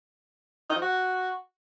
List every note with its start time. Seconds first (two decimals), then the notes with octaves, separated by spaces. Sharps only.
0.70 D#4
0.76 F3
0.82 F#4